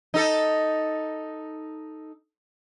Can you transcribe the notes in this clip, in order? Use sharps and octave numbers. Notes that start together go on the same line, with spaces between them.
D#4 A4